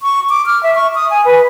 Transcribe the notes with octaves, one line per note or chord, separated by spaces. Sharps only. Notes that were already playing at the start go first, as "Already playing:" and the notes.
C#6
D6
F6
E5
C#6
D#6
G#5
B4